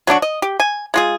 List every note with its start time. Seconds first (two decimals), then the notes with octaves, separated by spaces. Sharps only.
0.07 F#3 A3 D4 F#4
0.22 D#5
0.42 G4
0.60 G#5
0.94 G#3 F4 G#4